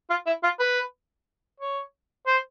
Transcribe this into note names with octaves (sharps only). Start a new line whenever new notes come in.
F4
E4
F4
B4
C#5
C5